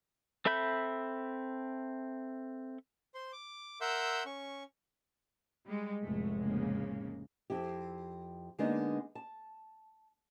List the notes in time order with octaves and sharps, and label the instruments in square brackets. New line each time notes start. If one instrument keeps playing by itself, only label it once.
[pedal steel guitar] C4 A4 E5 B5 G6
[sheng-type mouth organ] C5 C6
D6
A#4 E5 F#5 C6 E6 G6
C#4 C#6
[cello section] G3 G#3
[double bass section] F1 A2 G#3 [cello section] A3
[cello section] C#3 A#3
[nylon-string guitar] F2 E4 G4
D3 G#3 A#3 B3 D4 D#4
A5